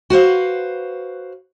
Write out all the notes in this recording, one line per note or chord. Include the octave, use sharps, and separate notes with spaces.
F#4 B4 C5 F5